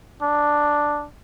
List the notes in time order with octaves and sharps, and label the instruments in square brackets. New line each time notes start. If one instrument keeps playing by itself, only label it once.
[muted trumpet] D4